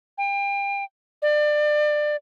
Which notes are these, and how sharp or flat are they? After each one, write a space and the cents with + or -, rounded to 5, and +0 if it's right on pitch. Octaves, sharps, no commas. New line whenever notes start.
G5 +35
D5 +25